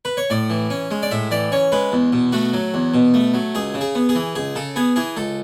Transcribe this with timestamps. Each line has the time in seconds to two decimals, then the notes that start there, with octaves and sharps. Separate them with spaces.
0.05 B4
0.17 C#5
0.30 A2 D5
0.50 E3
0.70 C#4
0.91 G#3
1.03 D5
1.11 A2 E5
1.31 E3 D5
1.52 C#4 C#5
1.72 G#3 B4
1.92 E2
2.13 B2
2.32 A3 F#4
2.53 F#3
2.74 E2
2.94 B2
3.14 A3
3.34 F#3
3.55 C#2 G#4
3.74 C#3
3.81 G#4
3.95 B3
4.09 G#4
4.15 E3
4.35 C#2 G#4
4.55 C#3 A4
4.76 B3 G#4
4.96 E3 G#4
5.17 C#2 A4